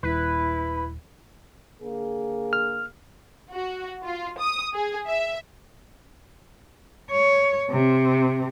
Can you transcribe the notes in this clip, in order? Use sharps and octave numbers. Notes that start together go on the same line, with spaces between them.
D#1 E4 B4
D3 A#3 G#4
F6
F#4
F4
D#6
G#4
E5
C#5
C3